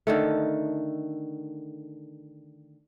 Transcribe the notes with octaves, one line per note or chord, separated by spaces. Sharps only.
D3 D#3 A3